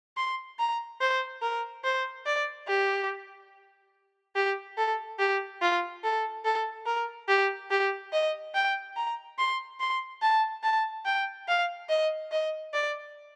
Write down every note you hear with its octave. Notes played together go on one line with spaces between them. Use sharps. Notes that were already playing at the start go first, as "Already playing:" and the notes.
C6
A#5
C5
A#4
C5
D5
G4
G4
A4
G4
F4
A4
A4
A#4
G4
G4
D#5
G5
A#5
C6
C6
A5
A5
G5
F5
D#5
D#5
D5